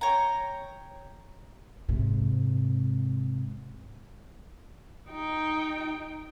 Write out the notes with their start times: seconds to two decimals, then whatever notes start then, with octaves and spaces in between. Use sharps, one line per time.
0.01 C#5 G5 A#5
1.89 G#2 C3
5.11 D#4 G5